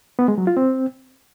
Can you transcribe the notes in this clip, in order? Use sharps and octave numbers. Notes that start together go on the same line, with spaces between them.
B3
G#3
F#3
F4
C4